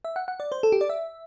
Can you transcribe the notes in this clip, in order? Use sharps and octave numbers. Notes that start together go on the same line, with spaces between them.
E5
F#5
F#5
D5
C5
A4
G4
D5
E5